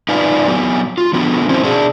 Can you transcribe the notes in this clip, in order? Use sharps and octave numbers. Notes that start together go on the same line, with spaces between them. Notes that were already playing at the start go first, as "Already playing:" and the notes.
D#4 F4 B4 D5 F5 G#5
F#3 B3 G4
F4
F3 B3 D4 F#4
C4 C#4 E4 C5
B2 D4 G#4